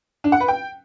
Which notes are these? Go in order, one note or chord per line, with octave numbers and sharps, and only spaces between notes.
D4
F#5
B4
G5